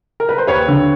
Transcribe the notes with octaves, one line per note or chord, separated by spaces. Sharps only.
A#4
B4
C5
D#2 B4 C#5
D3